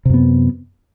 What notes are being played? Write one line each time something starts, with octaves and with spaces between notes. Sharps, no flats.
F#2 C3 B3